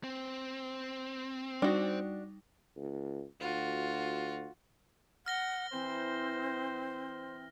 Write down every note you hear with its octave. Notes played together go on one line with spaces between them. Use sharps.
C4
G3 D4 D#4 F#4
C#2
D2 F4 F#4
F#5 F6 A#6 G7
E3 C4 C5